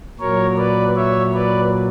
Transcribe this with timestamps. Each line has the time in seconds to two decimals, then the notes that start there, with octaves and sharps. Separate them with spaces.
0.19 A#2 F#3 A#4 C#5
0.57 B4 D5
0.96 C#5 E5
1.34 B4 D5